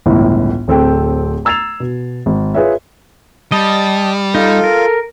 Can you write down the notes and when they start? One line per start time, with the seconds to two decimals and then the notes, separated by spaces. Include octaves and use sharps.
0.06 G1 C#2 A2 E3
0.68 D1 C4 A4 G5
1.45 A#5 E6 G#6 A6 C7 F7
1.80 B2
2.26 G#1
2.54 F4 G#4 B4 C#5 E5
3.52 G3 D#5 A5
4.35 D#4 F4 A4
4.64 A#4